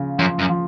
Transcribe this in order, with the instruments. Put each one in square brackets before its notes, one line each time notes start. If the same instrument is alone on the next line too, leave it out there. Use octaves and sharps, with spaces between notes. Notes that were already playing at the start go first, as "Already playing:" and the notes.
Already playing: [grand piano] C#3 F3
[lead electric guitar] F#2 [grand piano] F3
[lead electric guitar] F#2
[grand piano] F3